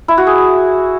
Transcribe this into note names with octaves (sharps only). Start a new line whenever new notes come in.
E4
F#4
G#4